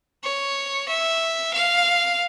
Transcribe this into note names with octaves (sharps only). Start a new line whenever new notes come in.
C#5
E5
F5